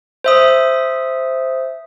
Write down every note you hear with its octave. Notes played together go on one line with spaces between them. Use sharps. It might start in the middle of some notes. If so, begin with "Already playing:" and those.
C5 E5 D#6